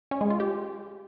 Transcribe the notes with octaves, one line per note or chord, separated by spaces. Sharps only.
C#4
G#3
F4
G4